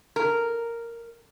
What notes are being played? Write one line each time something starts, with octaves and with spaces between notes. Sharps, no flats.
A#4